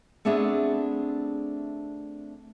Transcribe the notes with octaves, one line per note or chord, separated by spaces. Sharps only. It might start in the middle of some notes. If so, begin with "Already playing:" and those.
A3 B3 C4 D4 G#4 E5